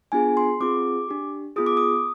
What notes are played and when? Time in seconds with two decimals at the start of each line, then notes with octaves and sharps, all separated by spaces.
0.12 B3 D4 F4 G#4 G#5
0.37 C6
0.60 C4 F4 G#4 D6
1.08 D4 G4
1.56 B3 F4 G#4 D#6
1.66 D6
1.77 D#6